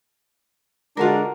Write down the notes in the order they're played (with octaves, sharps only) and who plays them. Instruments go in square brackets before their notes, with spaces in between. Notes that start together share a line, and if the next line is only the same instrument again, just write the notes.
[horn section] D3 G#3 D4 [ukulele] F4 F#4 A#4